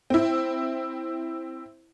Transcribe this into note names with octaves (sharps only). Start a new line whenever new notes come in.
C4 E4